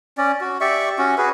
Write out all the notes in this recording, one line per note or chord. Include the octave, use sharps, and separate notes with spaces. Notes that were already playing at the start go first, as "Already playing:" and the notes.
C#4 D5
F#4
G4 D5 E5 C#6
C#4 F#4
F#4 G#4 B4